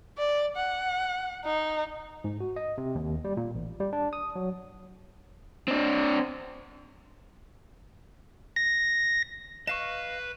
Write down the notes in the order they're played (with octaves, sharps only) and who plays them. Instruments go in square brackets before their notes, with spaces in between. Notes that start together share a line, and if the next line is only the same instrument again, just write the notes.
[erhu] D5
F#5
D#4
[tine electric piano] G#2
F#4
D#5
C3
D#2
G3
A#2
A1
G3
D4
D#6
F#3
[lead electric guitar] C4 D4
[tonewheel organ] A#6
[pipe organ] B4 [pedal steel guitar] D#5 F5 C#6 [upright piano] E7